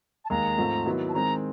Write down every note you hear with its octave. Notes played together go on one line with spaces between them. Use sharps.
A5
D#2 D#3 G#3 A#5
G#2 F3 A3 C4
D#3 F#3 B3 E4
A5
D#3 G#3 C4 A#5